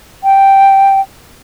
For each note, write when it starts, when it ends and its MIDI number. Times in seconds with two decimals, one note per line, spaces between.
0.24 1.00 79